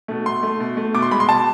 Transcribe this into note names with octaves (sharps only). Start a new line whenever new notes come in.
B2 A3
B2 C6
A3
B2
A3
B2 D6
C6
G#3 B5
C6
B2 A5